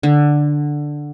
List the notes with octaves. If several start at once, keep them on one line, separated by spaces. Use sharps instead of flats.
D3